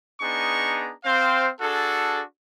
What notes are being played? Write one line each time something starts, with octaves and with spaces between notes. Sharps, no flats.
B3 D4 D#4 G#4 A#5 C#6
C4 C5 F5
D4 F#4 G#4 A4